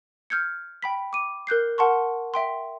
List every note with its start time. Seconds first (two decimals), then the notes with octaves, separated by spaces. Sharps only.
0.30 F6 G6 G#6 C#7
0.82 G5 B5 B6
1.13 D6 D#7
1.47 A#4 F#6 G6 C7
1.78 A#4 F#5 A5 C6 C#6
2.34 E5 G5 C6